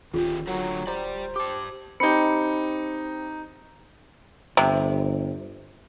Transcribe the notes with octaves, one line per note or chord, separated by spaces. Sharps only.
D1 D#3 C#4 F4 G4 G#4
D3 F#3 F#4 A#4 A#5
G4 C5 D5 A#5
G4 A5 D6
C4 D#4 G4 B5 G6 C#7
G1 C3